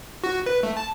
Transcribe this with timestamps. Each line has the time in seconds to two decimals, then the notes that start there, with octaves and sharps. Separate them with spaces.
0.24 F#4
0.46 B4
0.63 A3
0.77 A5